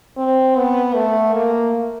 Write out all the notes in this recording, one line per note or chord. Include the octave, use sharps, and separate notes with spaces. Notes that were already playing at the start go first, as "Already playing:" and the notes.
C4
B3
A3
A#3